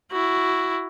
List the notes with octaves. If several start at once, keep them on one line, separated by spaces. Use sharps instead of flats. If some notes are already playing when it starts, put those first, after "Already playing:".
E4 F#4